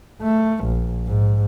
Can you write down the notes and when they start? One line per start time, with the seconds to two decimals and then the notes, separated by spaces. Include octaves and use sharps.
0.22 A3
0.65 A#1
1.07 G#2